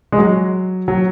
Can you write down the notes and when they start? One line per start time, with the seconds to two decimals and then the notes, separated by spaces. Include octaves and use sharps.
0.12 G#3
0.18 F#3
0.88 F#3